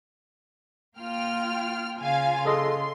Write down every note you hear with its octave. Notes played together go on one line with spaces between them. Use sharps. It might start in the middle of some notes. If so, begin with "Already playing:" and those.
A#3 F4 G5 F6
C#3 F4 F5 G#5
G#4 A4 D#5 C6